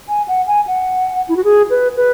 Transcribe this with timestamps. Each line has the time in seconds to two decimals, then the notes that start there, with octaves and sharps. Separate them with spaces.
0.09 G#5
0.28 F#5
0.47 G#5
0.67 F#5
1.29 E4
1.37 F#4
1.44 G#4
1.70 B4
1.96 B4